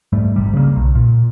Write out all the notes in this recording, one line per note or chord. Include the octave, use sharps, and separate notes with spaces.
G#2 G3 A3
G#1 C3 G3
C#3 G3 G#3 A#3
B1
A#2